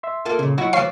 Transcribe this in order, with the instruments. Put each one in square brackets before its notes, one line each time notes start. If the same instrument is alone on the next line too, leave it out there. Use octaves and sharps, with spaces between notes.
[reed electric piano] E5 C6
[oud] A#3 F4 A4
[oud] A#2 [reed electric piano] C#3
[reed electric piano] F#3 [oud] D#4 E4 F#4
[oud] D2 E3 F3 [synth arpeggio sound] C#5 F5 C7